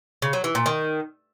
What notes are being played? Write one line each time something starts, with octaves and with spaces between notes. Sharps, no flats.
C#3
F#3
E3
A#2
D#3